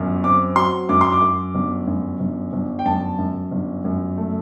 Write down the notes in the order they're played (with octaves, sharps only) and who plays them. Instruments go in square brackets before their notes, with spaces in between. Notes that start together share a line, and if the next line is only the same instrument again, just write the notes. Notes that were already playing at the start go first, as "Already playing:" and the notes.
Already playing: [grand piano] G1 F#2
C4 D6
F#3 C6
F#2 D6
C6
D6
F#2
G1
F#2
G1
G1
G5
F#2 A5
F#2
G1
F#2
A3